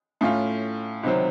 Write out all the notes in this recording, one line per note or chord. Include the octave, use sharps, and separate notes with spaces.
A2 A3 C#4 F4
C#2 C3 D#3 F#3 C4